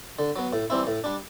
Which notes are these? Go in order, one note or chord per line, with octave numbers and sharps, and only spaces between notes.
D3
F#3 B3
A2
E3 G3 C4 E4
A2
G3 D4